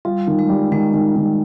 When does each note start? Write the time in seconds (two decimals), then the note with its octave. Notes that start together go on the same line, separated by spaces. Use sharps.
0.05 G3 F4
0.27 D#3
0.39 G#3
0.49 G3
0.71 D#3 G#3
0.93 D#3
1.16 D#3